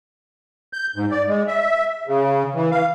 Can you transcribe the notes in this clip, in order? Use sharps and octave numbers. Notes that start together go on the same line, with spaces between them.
G6
G#2
D5
G#3
E5
C#3
E3
F5